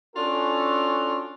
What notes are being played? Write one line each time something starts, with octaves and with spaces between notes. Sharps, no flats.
C#4 D4 F4 F#4 A4